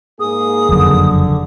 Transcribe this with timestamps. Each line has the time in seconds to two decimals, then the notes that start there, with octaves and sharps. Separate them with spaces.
0.20 G#2 A#3 G#4 D#6
0.69 F#1 F2 D3 F#3